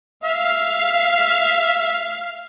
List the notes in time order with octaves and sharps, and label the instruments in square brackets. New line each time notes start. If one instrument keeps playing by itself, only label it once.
[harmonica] E5 [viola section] F5